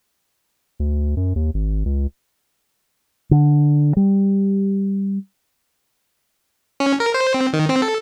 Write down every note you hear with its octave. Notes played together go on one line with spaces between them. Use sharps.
D2
F#2
D#2
G#1
C#2
D3
G3
C#4
A#4
C5
C4
D#3
C4
A4